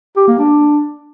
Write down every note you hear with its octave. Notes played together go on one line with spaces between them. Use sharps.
G4
A#3
D4